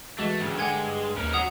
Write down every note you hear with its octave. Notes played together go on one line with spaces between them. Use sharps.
E3 G#3 A3 F#4
D2 G2 C#3
D3 G#3 F#5 G#5 G#6
D#2 C#4 D#4 A#4 B4
F#3 F#5 D#6 F7